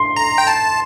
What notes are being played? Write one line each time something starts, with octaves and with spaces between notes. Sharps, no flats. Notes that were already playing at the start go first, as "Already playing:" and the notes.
Already playing: C6
A#5
G5
A5